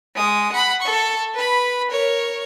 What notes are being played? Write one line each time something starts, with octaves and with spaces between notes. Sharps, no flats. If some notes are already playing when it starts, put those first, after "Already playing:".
G#3 D#6
F#5 B5
A4 C#6
B4 B5
A#4 C#5